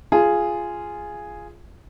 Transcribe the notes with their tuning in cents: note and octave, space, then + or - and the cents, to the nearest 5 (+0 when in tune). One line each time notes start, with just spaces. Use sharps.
F4 -10 G#4 +0